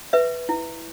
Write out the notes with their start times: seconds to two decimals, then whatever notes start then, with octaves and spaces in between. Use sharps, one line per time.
0.13 B4 E5
0.49 E4